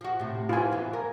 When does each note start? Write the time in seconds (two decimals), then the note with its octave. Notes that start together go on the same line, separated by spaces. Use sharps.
0.01 F3 F#4
0.19 A2 C3
0.49 F2 E3 F4 G#5
0.72 E3 B3
0.93 A#4